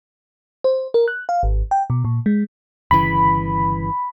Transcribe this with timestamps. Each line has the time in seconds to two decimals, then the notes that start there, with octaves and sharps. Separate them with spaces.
0.64 C5
0.94 A#4
1.08 F#6
1.29 F5
1.43 G#1
1.71 G5
1.90 B2
2.05 A#2
2.26 G#3
2.91 G1 C#3 E3 B5